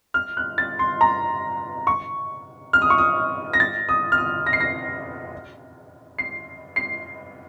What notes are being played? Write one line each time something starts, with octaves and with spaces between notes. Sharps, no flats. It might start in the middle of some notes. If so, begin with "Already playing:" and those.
F6
F#6
A6
C6
A#5
C#6
F6
D#6
C#6
D#6
A#6
A6
D#6
F6
D#6
A#6
C7
A#6
C7
C7